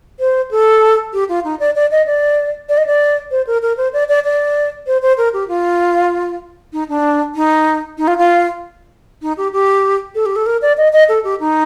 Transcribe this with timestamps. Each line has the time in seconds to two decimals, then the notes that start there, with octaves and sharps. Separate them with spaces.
0.20 C5
0.51 A4
1.13 G4
1.29 F4
1.44 D#4
1.60 D5
1.75 D5
1.91 D#5
2.06 D5
2.69 D5
2.77 D#5
2.87 D5
3.31 C5
3.47 A#4
3.62 A#4
3.77 C5
3.93 D5
4.09 D5
4.24 D5
4.87 C5
5.02 C5
5.18 A#4
5.33 G4
5.48 F4
6.73 D#4
6.89 D4
7.35 D#4
7.98 D#4
8.08 F4
8.18 F4
9.22 D#4
9.37 G4
9.53 G4
10.15 A4
10.26 G4
10.36 A4
10.46 A#4
10.62 D5
10.78 D#5
10.93 D#5
11.09 A4
11.24 G4
11.40 D#4